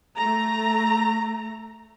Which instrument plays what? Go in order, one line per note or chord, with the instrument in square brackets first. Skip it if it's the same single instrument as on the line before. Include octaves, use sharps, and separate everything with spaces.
[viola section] A3 A#5